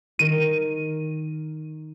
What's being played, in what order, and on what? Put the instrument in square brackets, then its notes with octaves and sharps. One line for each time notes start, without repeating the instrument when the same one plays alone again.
[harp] D#3 A#4 [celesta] D#7